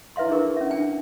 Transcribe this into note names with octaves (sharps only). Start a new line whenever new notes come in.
E4 B4 E5 F5 C6
D4 E4 G#4 A#4 B4 C#6
C#4 D4 E5
D4 G#5